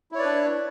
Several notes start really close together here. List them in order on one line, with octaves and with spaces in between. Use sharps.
E4 C#5 D5 B4 D4